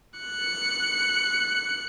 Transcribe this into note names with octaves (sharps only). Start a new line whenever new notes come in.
F#6 C#7